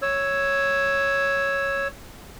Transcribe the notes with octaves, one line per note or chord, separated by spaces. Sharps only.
C#5 E6